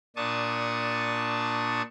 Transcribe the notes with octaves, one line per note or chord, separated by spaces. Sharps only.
A#2 D4 A5 C#6 D#6